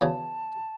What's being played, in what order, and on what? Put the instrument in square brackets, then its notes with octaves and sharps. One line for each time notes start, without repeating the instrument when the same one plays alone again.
[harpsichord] E2 C#3 F#3 [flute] A5